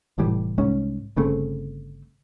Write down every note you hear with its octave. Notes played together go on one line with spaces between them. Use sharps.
F1 A2 E3 G3
C2 G#2 C#4
G1 C#3 A3 C4